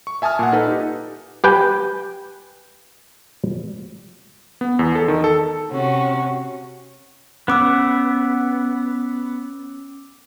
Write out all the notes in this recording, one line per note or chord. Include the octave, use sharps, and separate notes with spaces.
C#6
E5 G#5 A5 D#6 F6
A#2 F#5
D#4 A4 B4
D#4 G4
G4 B4 G5 G#5
B3
E2
A4
D#3
A4
C3 C#4 F#4
B3 C#4 D6 E6